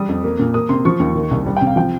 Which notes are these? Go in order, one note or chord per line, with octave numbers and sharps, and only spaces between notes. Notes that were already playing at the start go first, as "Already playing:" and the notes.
Already playing: G3 D#6
F2
A#3
A#2
A#3 D#6
C3 C6
F3 C#6
D#2
D#3
C2
G3
G5
C3
F5
F3 G5